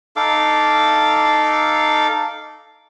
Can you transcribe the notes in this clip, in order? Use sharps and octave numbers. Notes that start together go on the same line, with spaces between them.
D#4 A4 F5 D6